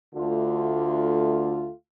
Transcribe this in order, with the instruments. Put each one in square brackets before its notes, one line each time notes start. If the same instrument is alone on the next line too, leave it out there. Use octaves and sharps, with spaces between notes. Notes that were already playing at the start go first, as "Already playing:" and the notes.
[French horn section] D2 D3 A3 F4